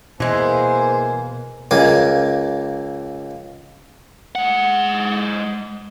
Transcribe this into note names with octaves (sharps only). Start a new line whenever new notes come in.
B2 E3 G#3 A#3 C5 G#5
C#2 A#3 G#5 D6
G#3 F#5